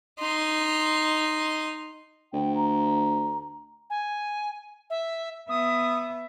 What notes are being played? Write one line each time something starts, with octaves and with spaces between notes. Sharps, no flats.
D#4 C6
D2 G5
A#5
G#5
E5
B3 E5 D#6